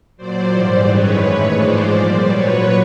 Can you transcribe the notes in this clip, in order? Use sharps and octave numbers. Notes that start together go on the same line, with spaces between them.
A#2 F#3 C5 D5
G#2 E3 G3 C5 D5
F#2 D#3 G#3 B4 C#5
A2 E3 G#3
G#2 F3 G#3 C5 D5
A#2 G3
A#2 F#3 B4 C#5